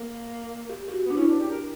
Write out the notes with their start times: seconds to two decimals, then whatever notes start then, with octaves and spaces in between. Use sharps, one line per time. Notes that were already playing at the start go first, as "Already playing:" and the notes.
Already playing: A#3
0.70 G4
0.88 G4
0.93 F#4
1.05 B3
1.10 D4
1.16 C#4 E4
1.27 D4
1.40 G4
1.51 A#4